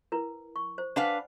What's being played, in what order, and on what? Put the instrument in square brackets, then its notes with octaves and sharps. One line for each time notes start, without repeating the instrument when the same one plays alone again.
[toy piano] E4 A#4 B4
C#6
C5
[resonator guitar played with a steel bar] D4 B4 F5 [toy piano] D5 F#5 G#5